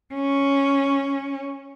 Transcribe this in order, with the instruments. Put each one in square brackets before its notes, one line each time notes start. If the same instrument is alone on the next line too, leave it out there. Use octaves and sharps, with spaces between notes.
[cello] C#4